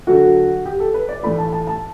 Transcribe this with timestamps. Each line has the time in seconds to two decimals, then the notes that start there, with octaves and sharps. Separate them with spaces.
0.07 D3 F#3 A3 F#4
0.66 G4
0.80 A4
0.94 B4
1.09 D5
1.23 A2 E3 A3 B5
1.39 A5
1.53 A5
1.67 A5